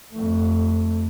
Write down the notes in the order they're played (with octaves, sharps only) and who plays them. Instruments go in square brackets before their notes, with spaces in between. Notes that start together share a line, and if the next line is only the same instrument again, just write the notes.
[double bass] F2 A3